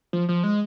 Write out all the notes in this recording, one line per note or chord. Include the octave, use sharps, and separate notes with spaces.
F3
F3
G#3